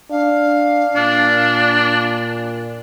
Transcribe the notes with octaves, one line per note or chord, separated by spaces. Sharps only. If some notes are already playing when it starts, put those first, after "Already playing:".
D4 F5
A#2 D4